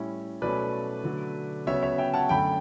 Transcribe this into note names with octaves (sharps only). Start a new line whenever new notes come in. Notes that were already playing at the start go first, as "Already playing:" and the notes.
Already playing: A2 G3 C#4 E4
B2 F#3 A3 C#4 B4 D5
D3 F#3 A3
C#3 F#3 B3 C#5 E5
C#5 E5
E5 G5
F#5 A5
F#2 D3 A3 G5 B5